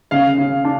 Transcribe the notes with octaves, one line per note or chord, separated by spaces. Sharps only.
C#3 F5
C#3
D4